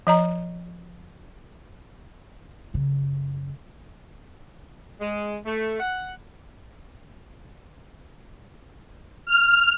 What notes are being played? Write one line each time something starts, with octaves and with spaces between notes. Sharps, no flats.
F3 D#5 A#5
F#2 C#3
G#3
A3
F#5
F6